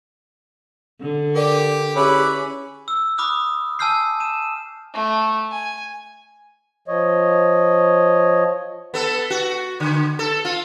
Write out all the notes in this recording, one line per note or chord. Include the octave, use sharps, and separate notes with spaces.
D3
G4 A#4 D5
C#4 E4 G4 G#4 B4 C#5 D5
E6
B5 D6 D#6 F6 F#6
G#5 A5 E6 F6 G6 C7
D#7 E7
A3
G#5
F3 C#5 D#5
B3 A4
F#4
D3
A4
F4